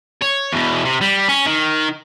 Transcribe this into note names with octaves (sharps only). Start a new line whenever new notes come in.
C#5
E2 B2
C3
G3
C#4
D#3